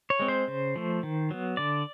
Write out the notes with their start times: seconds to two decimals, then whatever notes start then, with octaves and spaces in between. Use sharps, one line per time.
0.10 C#5
0.19 G#3 C4
0.28 C5
0.48 C#3
0.76 F3 A3
1.03 D#3
1.31 F#3 B3
1.57 D3 D5